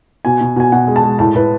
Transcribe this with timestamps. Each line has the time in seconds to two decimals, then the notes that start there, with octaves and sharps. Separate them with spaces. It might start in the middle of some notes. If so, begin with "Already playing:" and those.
0.25 B2 G#5
0.41 B2
0.56 B2 G#5
0.72 B2 F#5
0.87 G#3
0.96 A5
1.03 G#3
1.19 A2 A5
1.35 A2 B4